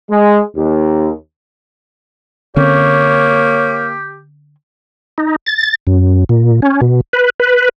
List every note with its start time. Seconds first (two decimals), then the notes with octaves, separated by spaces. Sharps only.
0.10 G#3
0.55 D#2
2.56 D3 A#3 C4 C#4 G4 C#5
5.18 D#4
5.46 A6
5.87 F#2
6.29 A#2
6.62 C#4
6.81 B2
7.13 B4
7.40 B4